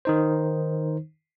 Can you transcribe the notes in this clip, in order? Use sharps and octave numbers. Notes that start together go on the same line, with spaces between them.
D#3 D#4 C5